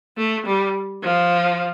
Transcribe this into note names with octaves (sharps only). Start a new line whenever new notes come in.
A3
G3
F3